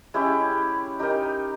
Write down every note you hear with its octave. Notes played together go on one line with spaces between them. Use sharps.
G#3 C#4 E4 G4
D#4 G4 A#4 D#5